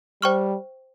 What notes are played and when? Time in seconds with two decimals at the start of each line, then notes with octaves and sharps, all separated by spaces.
0.22 G3 C5 G5 C#6 F6